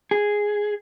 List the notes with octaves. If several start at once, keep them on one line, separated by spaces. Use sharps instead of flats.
G#4